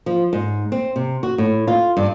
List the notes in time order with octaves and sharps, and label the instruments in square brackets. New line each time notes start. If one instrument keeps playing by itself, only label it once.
[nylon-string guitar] F3
G#2
C4
C3
F#4
A2
F4
G2